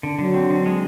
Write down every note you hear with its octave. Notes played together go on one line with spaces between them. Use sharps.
D3
D3 F#3
C4
D3
G#3